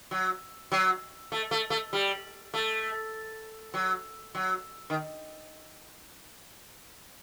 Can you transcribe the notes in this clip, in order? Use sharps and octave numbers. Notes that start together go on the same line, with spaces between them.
F#3
F#3
A3
A3
A3
G3
A3
F#3
F#3
D#3